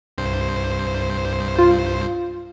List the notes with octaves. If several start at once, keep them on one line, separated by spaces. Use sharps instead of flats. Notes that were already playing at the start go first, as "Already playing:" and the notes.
C2 G2 C5
F4